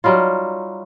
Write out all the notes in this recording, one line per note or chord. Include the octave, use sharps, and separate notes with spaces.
F#3 G3 D#4 F4